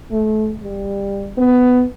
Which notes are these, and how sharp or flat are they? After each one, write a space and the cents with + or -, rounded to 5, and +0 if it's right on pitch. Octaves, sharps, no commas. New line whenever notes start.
A3 -30
G3 +20
B3 +15